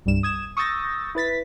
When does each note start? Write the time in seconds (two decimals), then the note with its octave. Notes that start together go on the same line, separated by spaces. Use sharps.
0.06 C2 G2 G3 E7
0.23 D#6 G#6 E7
0.57 C#6 D#6 E6 G6 A6 A#6
1.15 E4 B4 A6 B6